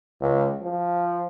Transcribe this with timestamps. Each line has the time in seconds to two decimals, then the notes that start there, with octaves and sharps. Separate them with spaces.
0.21 C#2
0.61 F3